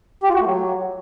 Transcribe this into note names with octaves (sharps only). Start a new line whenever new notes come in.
G4
F4
F#4
A3
F#3